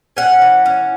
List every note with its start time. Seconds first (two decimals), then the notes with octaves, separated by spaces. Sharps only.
0.17 C#4 F#5
0.41 E3
0.66 C#4